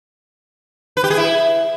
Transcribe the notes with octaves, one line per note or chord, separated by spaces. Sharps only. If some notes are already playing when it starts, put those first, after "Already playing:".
B4
G4
G#4
E4